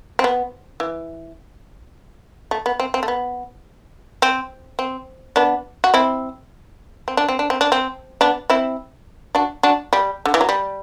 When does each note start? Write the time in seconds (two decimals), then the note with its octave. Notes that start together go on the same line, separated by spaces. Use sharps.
0.19 C4
0.24 B3
0.80 E3
2.51 A3
2.66 B3
2.80 C4
2.94 C4
3.03 A3
3.08 B3
4.22 C4
4.79 C4
5.36 B3 D4
5.84 F#4
5.94 C4 E4
7.08 C4
7.17 D4
7.29 C4
7.39 D4
7.50 C4
7.61 D4
7.72 C4
8.21 B3 D4
8.50 C4 E4
9.35 D4 F#4
9.63 D4 F#4
9.93 G3
10.26 D3
10.34 E3
10.41 F#3
10.49 G3